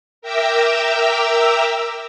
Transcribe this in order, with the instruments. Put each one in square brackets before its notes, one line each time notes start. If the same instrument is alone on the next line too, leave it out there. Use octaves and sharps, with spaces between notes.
[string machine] A#4 E5 G5 A#5 D6 E6